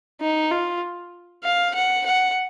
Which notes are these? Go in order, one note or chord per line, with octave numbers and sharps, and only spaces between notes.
D#4
F4
F5
F#5
F#5